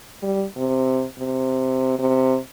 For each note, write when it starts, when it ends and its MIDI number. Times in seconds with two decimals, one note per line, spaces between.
0.23 0.45 55
0.57 1.04 48
1.19 1.97 48
1.99 2.37 48